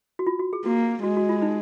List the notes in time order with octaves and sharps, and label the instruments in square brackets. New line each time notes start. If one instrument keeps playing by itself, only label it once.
[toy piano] F#4
F4
F#4
G#4
[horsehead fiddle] A#3 [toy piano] F#4
[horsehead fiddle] G#3 [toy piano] F#4
[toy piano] F#4
F4
D#4